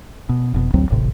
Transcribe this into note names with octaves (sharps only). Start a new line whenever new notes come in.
B2
F1 B2
A1 D2 F#3 C4
D1 G#1 A2 C3